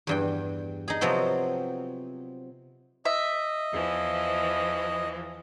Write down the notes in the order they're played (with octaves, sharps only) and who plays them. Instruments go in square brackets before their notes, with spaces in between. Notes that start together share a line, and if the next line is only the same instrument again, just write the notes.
[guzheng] E2 G2 G5
D#4 G#4
C3 F3 F#3 B3 C4
[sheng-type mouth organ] D#5 [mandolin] E5
[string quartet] E2 E3 F3